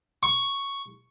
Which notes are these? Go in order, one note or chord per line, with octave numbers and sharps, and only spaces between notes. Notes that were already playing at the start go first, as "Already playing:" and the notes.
C#6